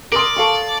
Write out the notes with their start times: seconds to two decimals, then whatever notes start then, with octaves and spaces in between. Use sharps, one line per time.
0.12 A#4 D5 C6 D#6 D7
0.36 A4 F5 C#6